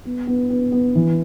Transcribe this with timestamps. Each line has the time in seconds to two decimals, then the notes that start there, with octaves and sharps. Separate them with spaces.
0.05 B3
0.27 B3
0.50 B3
0.72 B3
0.95 E3